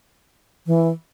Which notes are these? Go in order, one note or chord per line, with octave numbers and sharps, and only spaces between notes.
E3